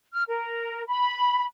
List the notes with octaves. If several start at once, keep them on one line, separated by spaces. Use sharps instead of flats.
F6
A#4
B5